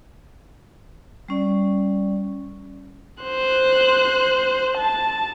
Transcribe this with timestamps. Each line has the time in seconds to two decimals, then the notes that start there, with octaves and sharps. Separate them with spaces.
1.28 G3 C#4 D5
3.23 C5 F#6
4.77 A5